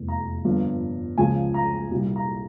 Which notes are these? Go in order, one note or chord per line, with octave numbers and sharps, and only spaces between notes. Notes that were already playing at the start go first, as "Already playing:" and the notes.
Already playing: F1 E2 E3 G3
A#5
G1 G2 F3
C#2 C#3 F3 G#5
A#5
C2 A#2 G3
A#5